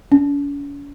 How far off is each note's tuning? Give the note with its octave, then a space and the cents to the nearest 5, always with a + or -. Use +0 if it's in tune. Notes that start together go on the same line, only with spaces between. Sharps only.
C#4 +45